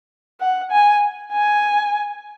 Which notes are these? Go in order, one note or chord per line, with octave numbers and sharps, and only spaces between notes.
F#5
G#5
G#5